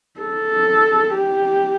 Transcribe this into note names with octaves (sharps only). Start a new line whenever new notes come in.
A4
G4